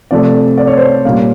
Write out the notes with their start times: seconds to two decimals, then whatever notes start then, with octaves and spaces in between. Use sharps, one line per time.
0.11 C3 F3 A3 D5
0.58 D5
0.67 C#5
0.77 C5
0.87 C#5
1.05 A#2 G3 A#3 C#4 F5